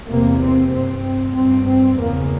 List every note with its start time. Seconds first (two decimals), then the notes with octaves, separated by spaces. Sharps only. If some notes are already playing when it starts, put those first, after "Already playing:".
0.09 E2 C3 A#3
0.41 C4
0.72 G2 C4
1.35 G2 C4
1.67 C4
1.99 E2 C#3 A#3